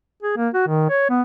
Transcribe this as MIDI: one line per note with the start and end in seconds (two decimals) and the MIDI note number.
0.22 0.35 68
0.37 0.49 58
0.54 0.63 66
0.68 0.86 51
0.89 1.07 73
1.10 1.22 59